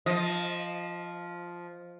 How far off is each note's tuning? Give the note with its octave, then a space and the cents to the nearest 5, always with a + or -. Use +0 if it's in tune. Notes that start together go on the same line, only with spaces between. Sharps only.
F3 +0 D#5 +0